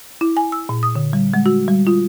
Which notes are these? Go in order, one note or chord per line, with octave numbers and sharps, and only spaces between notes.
E4
G#5
E6
A#2
D#6
D3
G3
G#3
F#4
G3
F4